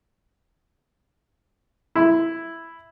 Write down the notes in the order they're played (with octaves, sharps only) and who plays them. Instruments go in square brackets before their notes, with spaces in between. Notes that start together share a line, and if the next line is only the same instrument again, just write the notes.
[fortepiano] E4 B5